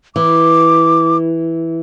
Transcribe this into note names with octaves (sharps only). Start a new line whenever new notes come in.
E3 D6